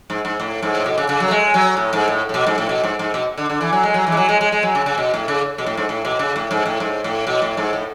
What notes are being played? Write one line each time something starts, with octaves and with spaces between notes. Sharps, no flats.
G#2
G#2
A2
G#2
A2
B2
C#3
C#3
F#3
A3
G#3
F#3
A2
G#2
A2
A2
B2
G#2
A2
B2
G#2
G#2
B2
D3
D3
E3
F#3
G#3
F#3
E3
G#3
F#3
G#3
G#3
G#3
F#3
C#3
C#3
B2
A2
C#3
B2
A2
G#2
A2
B2
C#3
A2
G#2
A2
G#2
A2
B2
A2
G#2
A2